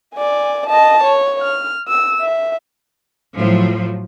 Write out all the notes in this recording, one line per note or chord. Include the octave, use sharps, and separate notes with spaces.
D5 G#5
D#5 A5
C#5
F6
E6
E5
A2 F3 F#3